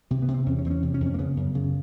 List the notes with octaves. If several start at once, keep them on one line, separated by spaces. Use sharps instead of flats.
C3 B3
B3
C3
C4
E2 C#4
C#4
E2 C4
C#4
C3
C#4
F2
C#4
A#3
C#3 B3
F#2
C#3